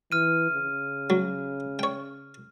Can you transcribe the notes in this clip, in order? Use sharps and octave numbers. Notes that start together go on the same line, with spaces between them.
E3 F6 D#7
C#3
F#3
C#5 G5